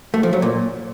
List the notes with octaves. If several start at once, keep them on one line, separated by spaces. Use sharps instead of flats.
A3
F3
F#3
A#2